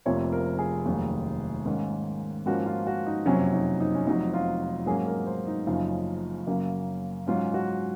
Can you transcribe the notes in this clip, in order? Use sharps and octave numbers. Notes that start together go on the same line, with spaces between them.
F1 F2 C3 F3 A#3 C#5
A#4
G#4
F1 D#2 D#3 F#3
G#2 D#3 A#3 C#4
G#2 F3 A#3 C#4 F#4
F4
F#4
D#4
F#1 F2 C3 F#3 C#4
D#4
D#4
C#4
F1 F2 C3 F#3 D#4
F4
G#2 F#3 A#3 C#4 G#4
A#4
C5
D#4
F#1 F#2 C#3 F3 D#4
F#2 C#3 F#3 A#3
G#2 F#3 C#4 F4
F#4